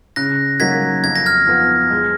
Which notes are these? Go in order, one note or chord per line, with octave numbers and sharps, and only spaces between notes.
C#3 F#6 A#6
F#3 A#3 D#4 F#4 G#6 B6
F2 G#6
A#6
F6 G#6
F3 B3
G#3